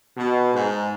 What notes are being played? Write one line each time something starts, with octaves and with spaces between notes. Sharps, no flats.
B2
G#2